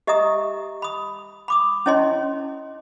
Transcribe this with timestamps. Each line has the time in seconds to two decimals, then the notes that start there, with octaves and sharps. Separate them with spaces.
0.07 G4 D#5 E5 A#5 D#6
0.82 B5 D#6
1.48 B5 D6 D#6
1.86 C#4 E4 C#5 D#5 G#5 C6